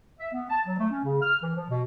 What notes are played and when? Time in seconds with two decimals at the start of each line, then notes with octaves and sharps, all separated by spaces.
0.20 E5
0.33 B3
0.50 A5
0.67 F#3
0.79 A3
0.91 C#4
1.04 C#3
1.22 F6
1.43 E3
1.55 F3
1.70 B2